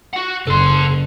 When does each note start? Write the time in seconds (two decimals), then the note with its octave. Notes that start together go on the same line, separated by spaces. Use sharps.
0.13 F#4 F#5
0.47 F#1 A4 C6